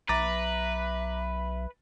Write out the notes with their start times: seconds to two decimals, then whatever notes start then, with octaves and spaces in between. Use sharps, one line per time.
0.09 B1 B4 E5 A#5 D6 A6